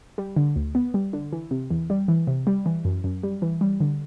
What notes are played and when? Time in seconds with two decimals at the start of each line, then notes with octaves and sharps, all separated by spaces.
0.18 G3
0.36 D3
0.56 D2
0.75 B3
0.94 G3
1.13 D3
1.32 E3
1.51 C3
1.70 E2
1.90 G3
2.08 E3
2.27 C3
2.47 G3
2.66 E3
2.85 F#2
3.04 F#2
3.23 G3
3.42 E3
3.61 G3
3.81 D3